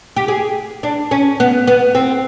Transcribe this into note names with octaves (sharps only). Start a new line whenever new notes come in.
G4
G#4
D4
C#4
B3
B3
C4